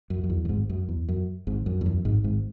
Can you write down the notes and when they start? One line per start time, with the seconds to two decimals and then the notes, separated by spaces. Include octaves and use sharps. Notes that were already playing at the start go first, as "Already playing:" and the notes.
0.10 F#2
0.24 F#2
0.30 E2
0.45 F#2
0.49 G#1 G#2
0.69 F#2
0.89 E2
1.09 F#2
1.47 G#1 G#2
1.66 F#2
1.81 E2
1.86 F#2
2.05 G#1 G#2
2.24 G#1 G#2